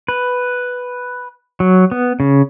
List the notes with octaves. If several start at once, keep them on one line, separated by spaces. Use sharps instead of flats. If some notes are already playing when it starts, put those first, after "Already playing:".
B4
F#3
B3
C#3